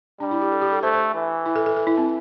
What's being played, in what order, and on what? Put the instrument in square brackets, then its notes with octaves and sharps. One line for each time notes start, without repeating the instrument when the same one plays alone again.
[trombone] G3 [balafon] D4
[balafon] E4
G4
A4
G4
A4
[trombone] A3 [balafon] C5
[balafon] C5
[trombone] E3
[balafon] E4
A4
A4
A4
E4
C4